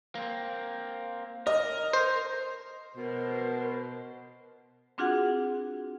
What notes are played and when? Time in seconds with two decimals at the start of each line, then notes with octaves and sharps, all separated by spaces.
0.15 A#3 C4
1.47 A#4 D#5
1.93 C5
2.96 B2 A#4 C5
4.98 C4 D4 F4 F#4 G#4 F#5